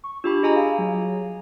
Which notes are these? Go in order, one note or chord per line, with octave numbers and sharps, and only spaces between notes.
C#6
D4 F4 G4 B5
G#4 D#5 G#5 A#5
F5
F#3